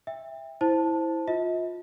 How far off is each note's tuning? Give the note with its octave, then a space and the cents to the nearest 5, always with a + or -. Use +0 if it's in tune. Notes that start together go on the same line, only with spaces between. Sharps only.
E5 +0 G5 +30
E4 -10 C5 +0 A5 +0
F4 +25 D#5 +45